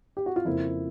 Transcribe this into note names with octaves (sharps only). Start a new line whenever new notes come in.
G4
F#4
F4
F2 C#3 F3 A#3 E4